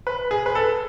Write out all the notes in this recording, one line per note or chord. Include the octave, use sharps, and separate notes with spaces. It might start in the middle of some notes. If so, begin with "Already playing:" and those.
B4
G#4
B4
A4